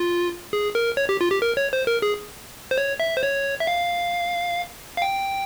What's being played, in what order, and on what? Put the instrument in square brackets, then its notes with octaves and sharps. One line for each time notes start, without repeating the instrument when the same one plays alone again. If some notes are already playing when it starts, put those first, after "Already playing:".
Already playing: [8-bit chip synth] F4
G#4
A#4
C#5
G4
F4
G4
A#4
C#5
C5
A#4
G#4
C5
C#5
E5
C5
C#5
E5
F5
F5
G5